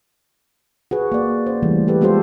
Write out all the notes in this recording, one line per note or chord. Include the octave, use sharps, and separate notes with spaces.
F#4 G#4 B4
A#3 D5
C#4 C5
E3 G3 A3
G4 A4 B4
G#3 B3 F4 G4 A4 C5